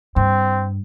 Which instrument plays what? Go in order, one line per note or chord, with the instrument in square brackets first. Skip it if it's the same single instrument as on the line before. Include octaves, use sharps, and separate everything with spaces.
[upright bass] G2 [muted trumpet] C4